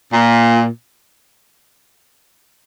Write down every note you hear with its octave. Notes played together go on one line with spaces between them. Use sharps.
A#2